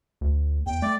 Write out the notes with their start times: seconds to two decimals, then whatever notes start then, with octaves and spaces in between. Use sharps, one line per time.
0.21 D2
0.66 E2 G5
0.82 A3 D5